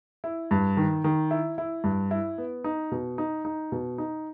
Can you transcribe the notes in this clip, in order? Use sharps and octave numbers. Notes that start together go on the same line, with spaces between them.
E4
G2
D#3
D#3
E4
E4
G2
E4
B3
D#4
B2
D#4
D#4
B2
D#4